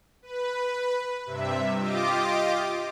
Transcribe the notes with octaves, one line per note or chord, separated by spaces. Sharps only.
B4
G2 C3 E5
F4 G4 D#5 D6